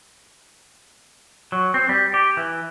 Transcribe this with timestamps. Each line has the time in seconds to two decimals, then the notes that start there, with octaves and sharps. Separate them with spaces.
1.52 F#3
1.74 C4
1.89 G3
2.14 G4
2.37 E3